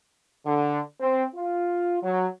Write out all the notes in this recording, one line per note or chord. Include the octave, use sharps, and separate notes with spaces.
D3
C4
F4
F#3